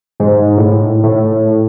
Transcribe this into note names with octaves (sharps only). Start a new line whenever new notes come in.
G#2
A2
A2